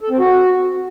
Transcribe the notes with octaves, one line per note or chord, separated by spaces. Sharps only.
A4
C4
F#4